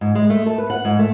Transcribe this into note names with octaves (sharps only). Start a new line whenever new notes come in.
G#2
G#3
A3
A4
B4
F#5
G#2
A3